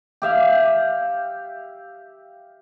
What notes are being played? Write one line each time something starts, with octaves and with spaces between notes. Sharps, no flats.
G4 E5 F5